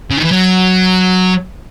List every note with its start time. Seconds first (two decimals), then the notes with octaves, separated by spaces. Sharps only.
0.10 C#3
0.17 D#3
0.24 E3
0.31 F#3